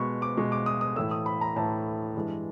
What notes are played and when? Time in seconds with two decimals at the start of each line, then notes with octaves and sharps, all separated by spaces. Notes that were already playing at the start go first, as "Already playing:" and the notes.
Already playing: B2 G#3 B5 C#6
0.22 D6
0.37 B2 G#3 C#6
0.52 D6
0.66 D#6
0.81 D#6
0.96 A2 E3 A3 E6
1.11 D#6
1.26 B5
1.41 A#5
1.56 A2 E3 A3 A5
2.15 G2 E3 G#3